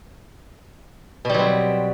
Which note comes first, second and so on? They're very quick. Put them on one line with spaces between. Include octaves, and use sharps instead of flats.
B2 G3 F#3 C4